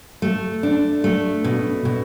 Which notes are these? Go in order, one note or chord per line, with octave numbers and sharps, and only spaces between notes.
A3
D4
A3
B2
B2